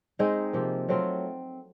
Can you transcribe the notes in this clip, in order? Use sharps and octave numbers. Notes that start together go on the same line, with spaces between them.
G#3 C4 D#4 G#4
C3 F3 A#3
F#3 A3 C4 F4